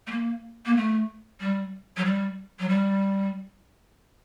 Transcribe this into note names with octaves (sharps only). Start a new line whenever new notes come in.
A3
A#3
A#3
A3
G3
F#3
G3
F#3
G3